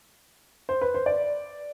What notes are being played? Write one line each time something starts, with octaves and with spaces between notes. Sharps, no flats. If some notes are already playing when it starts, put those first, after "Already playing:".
C5
B4
C5
D5